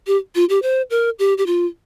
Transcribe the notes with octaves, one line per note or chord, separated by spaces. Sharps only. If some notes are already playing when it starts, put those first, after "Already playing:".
G4
F4
G4
C5
A#4
G4
G4
F4